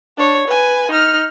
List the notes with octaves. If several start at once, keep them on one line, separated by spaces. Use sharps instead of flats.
D4 C#5
B4 G#5
D#4 F6